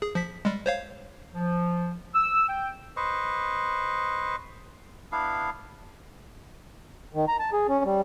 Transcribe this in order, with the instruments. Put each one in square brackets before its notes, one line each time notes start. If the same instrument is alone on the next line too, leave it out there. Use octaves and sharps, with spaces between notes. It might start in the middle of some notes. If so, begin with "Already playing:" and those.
[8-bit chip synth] G#4
F3 B6
G3 G#3
C5 C#5 F5
[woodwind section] F3
E6
G5
[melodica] B4 C5 D#5 C#6
B3 D4 E4 F5
[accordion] D#3
A#5
A5
G#4
C#4
G3